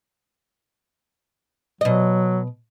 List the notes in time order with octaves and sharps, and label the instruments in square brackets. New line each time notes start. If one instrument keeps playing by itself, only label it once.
[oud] B2 D#5 [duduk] F#3